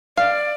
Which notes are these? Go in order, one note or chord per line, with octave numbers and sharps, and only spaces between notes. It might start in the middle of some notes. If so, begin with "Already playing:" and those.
D5 F5